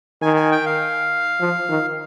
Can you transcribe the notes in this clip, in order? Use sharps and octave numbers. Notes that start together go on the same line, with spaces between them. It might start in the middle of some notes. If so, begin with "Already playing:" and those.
D#3 G#5
G#5
G5
F5
F3
D#3